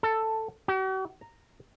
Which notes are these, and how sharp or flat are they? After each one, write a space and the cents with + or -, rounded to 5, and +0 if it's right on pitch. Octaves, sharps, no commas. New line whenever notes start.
A4 +10
F#4 +45
A#5 -10